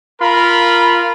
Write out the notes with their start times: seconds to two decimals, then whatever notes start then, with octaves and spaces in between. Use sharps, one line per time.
0.21 F4 A#4 B5